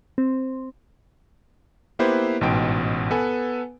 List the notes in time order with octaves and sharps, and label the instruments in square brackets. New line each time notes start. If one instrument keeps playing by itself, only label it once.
[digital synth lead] C4
[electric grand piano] A#3 B3 E4 G4 B4 C5
A1 G#2 B2 G5 D7
B3 A4 B4 F#5 G#5